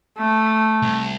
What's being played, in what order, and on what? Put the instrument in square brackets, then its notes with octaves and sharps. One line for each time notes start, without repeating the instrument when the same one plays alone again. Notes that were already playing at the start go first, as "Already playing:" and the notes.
[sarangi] A3
[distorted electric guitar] C2